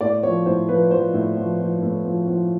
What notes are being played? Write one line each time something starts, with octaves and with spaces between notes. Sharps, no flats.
A2 D5
F3 C#5
A2 C5
F3 B4
F3 C5
A2
F3
F3
A2
F3
F3